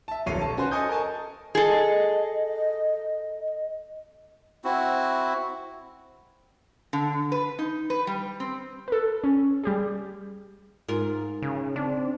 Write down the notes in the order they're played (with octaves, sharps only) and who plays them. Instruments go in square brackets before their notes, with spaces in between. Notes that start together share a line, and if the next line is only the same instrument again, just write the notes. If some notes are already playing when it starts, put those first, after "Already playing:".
[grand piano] E5 A5
D#1 B1 A4 C#5 C7 D#7
A5
C#4 F#4 B4 C5
A4 D#5 G#5 C#6 D#6 G6
A#4 D#5 G#5 A5
[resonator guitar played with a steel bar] G#4 A4 [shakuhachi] D#5
[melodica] C4 E4 F#4
[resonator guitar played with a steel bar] D3
B4
D#4
B4
G3
C4
[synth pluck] A4 B4
C#4
G3 G4 G#4
[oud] G#2 F4 A#4
[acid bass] C#3
[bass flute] C4 [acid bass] D4